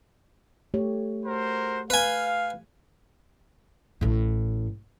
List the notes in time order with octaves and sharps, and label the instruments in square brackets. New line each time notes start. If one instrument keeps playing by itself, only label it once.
[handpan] A3 G4 C#5
[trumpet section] F#4 A#4 C5
[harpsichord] B4 G#5 [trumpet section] F5
[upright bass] A1 A2